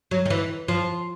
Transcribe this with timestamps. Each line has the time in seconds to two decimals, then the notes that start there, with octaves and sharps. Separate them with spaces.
0.11 F#3
0.26 D#3
0.30 E3
0.68 F3